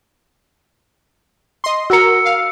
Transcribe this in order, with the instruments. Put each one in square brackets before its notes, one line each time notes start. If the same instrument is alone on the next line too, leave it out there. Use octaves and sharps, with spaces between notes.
[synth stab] D#5 C6
[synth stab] F#4 A#4 [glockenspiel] E6 C#7
[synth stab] F5